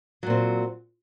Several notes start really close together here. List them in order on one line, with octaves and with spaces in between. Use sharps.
F#3 A#2 C4